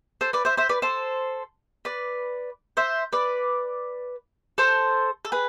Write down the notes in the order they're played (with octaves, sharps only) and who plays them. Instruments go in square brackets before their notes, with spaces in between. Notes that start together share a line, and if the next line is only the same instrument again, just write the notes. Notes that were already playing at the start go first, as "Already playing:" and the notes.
[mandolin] A4 C5
B4 D5
C5 E5
C5 E5
B4 D5
A4 C5
B4 D5
C5 E5
B4 D5
A4 C5
A4
G#4 B4